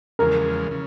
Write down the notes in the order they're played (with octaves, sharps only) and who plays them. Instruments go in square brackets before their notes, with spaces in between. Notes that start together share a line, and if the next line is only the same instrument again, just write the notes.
[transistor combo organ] E2 C#3 F3 G#3 [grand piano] A#4
[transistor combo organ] C#3